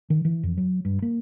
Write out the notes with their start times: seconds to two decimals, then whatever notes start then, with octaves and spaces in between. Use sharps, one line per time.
0.10 D#3
0.25 E3
0.43 F2
0.57 F#3
0.85 G2
1.02 A#3